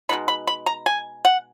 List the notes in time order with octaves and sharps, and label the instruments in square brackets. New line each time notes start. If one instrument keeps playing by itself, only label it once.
[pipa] B2 G#3 B3 D#4 B5
B5
B5
A#5
G#5
F#5